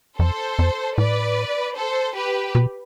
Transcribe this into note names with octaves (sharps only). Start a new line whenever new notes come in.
F2 A4 C5
F2
A2 B4 D5
A4 C5
G4 B4
B2